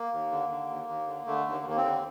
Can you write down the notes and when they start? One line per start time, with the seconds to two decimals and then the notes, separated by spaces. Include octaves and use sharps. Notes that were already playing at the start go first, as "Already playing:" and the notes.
Already playing: A#3
0.12 D#2
0.31 D3
0.50 D3
0.69 D#2
0.88 D#2
1.07 D3
1.27 D3 A3
1.45 D#2
1.51 A#3
1.65 D#2 A#3
1.77 C4
1.84 D3